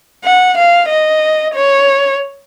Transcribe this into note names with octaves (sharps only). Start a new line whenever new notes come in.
F#5
F5
D#5
C#5